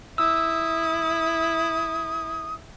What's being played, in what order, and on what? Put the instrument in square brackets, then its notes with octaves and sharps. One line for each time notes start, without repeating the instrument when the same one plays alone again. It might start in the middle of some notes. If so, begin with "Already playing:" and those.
[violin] E4 [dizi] D#6 [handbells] E6